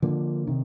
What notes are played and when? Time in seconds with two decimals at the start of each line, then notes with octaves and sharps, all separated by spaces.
0.02 D3 F3 A#3 D4
0.47 C3 D#3